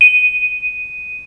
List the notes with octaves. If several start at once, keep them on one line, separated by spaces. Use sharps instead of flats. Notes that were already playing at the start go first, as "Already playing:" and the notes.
D#7